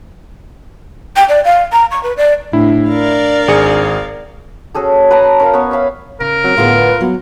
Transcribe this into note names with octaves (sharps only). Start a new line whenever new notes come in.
G5
D5
F5
A#5
C#6
B4
D5
A2 D4 E4
A#4 D5 F5
G#1 G#4 C#7
C#4 F#4 G#4 A4
B4 F#5 A5 A#5
C#4 A#4 F5
B3 C#5
C#5 E5 F5 B5
C#3 A#4
F#3 C4
A2 D3 B3 F4 G#4
B4
F#3 B3